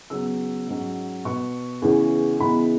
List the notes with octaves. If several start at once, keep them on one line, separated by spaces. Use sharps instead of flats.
C#3 F#3 B3 E6
G#2 F#3 C#4
B2 B3 C#6
E2 C#3 E3 C#4
C#3 E3 G#3 B3 B5